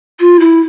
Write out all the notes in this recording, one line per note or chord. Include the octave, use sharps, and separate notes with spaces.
F4
E4